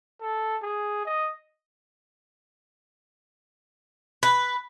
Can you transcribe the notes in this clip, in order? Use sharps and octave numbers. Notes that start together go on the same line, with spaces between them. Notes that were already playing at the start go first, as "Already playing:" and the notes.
A4
G#4
D#5
B4